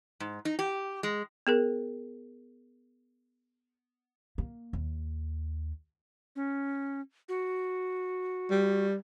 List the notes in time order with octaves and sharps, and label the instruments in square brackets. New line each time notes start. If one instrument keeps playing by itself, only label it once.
[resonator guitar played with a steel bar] G#2
D#4
G4
G#3
[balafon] B3 G#4 A#4
[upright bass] A#3
D#2
[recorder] C#4
F#4
[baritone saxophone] G3